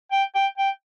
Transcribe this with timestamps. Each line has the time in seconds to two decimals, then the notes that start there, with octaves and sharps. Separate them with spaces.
0.12 G5
0.35 G5
0.58 G5